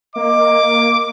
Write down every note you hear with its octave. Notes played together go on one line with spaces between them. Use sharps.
A#3 D#5 D6